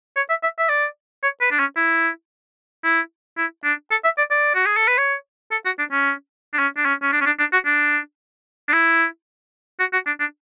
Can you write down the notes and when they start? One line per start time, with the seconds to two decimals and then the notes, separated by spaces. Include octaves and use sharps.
0.16 C#5
0.30 E5
0.43 E5
0.59 E5
0.69 D5
1.23 C#5
1.41 B4
1.51 D4
1.60 C#4
1.77 E4
2.84 E4
3.37 E4
3.64 D4
3.91 A4
4.04 E5
4.18 D5
4.31 D5
4.55 F#4
4.66 G#4
4.77 A4
4.87 B4
4.98 C#5
5.52 A4
5.66 F#4
5.79 D4
5.92 C#4
6.54 D4
6.59 C#4
6.77 D4
6.85 C#4
7.02 C#4
7.13 D4
7.21 C#4
7.26 D4
7.39 D4
7.53 F#4
7.66 D4
8.68 D4
8.73 E4
9.80 F#4
9.93 F#4
10.07 D4
10.20 D4